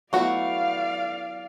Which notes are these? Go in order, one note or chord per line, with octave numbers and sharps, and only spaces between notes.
F#3 A3 B3 E4 F#4 D5 F5